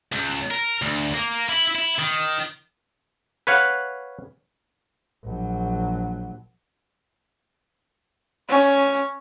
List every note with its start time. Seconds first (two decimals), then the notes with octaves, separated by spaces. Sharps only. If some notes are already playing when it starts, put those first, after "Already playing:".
0.12 C#2
0.50 A#4
0.82 D2
1.14 A#3
1.49 E4
1.76 E4
1.99 D#3
3.47 B4 C#5 F5 F#5
5.24 A#1 F#3
8.49 C#4